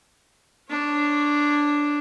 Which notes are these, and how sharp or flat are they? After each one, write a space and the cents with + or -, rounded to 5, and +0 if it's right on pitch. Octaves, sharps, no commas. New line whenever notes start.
D4 +0 C#5 -20